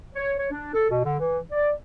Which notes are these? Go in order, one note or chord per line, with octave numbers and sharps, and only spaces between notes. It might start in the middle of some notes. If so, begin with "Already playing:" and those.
C#5
C#5
D4
A4
B2
D3
E3
D5